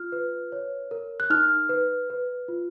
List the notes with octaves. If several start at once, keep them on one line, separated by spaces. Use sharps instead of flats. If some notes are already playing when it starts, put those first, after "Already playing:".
Already playing: F4 F6
B4
C#5
A#4
F#6
D#4 F6
B4
B4
F4